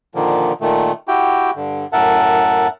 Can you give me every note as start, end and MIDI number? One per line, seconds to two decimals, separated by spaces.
0.15 0.53 46
0.15 0.53 50
0.15 0.53 51
0.15 0.53 53
0.15 0.53 58
0.61 0.92 46
0.61 0.92 51
0.61 0.92 57
1.08 1.51 64
1.08 1.51 66
1.08 1.51 67
1.08 1.51 79
1.56 1.87 43
1.56 1.87 50
1.93 2.68 42
1.93 2.68 45
1.93 2.68 70
1.93 2.68 76
1.93 2.68 78
1.93 2.68 81